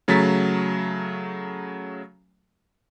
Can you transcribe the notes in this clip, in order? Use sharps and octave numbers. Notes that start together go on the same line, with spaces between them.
C#3 F#3 A3 A#5 A6 B6